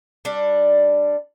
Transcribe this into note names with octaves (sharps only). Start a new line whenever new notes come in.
G3 D4